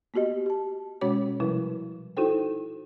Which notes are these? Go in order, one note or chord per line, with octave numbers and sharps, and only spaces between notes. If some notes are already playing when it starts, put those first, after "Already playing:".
A#3 B3 F#4 G4 D#5
G4 A5
B2 G#3 C#4 F#4 C#5 D6
C3 F3 G3 E4 B4
D#4 E4 F#4 A4 C5 G5